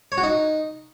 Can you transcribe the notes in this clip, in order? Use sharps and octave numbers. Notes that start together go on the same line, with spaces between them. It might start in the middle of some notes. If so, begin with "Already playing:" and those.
C#5
F#4
D#4